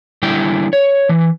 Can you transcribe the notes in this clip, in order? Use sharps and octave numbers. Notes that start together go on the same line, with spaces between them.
D3 G3 E4 G5
C#5
E3